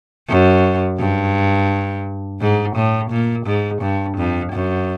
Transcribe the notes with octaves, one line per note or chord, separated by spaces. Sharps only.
F#2
G2
G#2
A2
A#2
G#2
G2
F2
F#2